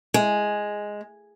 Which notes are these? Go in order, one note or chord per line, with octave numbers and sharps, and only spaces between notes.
G#3